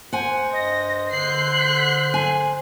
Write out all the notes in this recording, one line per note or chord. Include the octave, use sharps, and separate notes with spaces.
C5 F#5 G#5
G2 D#5 A#6
D3 F#6 G6 C7
G#5